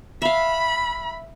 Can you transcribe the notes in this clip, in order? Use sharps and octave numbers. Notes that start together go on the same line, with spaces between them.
E5 F5 B5